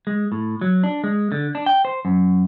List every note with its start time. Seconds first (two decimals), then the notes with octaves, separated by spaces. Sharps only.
0.07 G#3
0.32 A2
0.61 F#3
0.84 D4
1.04 G#3
1.32 D3
1.55 D4
1.66 G5
1.85 C5
2.05 F#2